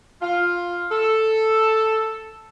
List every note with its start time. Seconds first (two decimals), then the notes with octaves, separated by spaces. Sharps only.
0.22 F4
0.91 A4